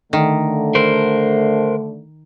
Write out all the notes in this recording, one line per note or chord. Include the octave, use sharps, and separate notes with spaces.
D3 D#3 A3
A#4 C5